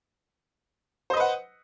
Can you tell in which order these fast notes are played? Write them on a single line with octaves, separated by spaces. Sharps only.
C5 D#5 B4 F#5